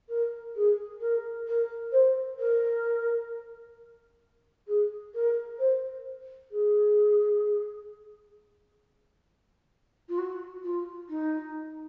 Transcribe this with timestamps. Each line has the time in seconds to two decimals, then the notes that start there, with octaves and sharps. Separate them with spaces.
0.09 A#4
0.56 G#4
1.01 A#4
1.47 A#4
1.92 C5
2.39 A#4
4.68 G#4
5.14 A#4
5.59 C5
6.51 G#4
10.09 F4
10.18 F#4
10.64 F4
11.09 D#4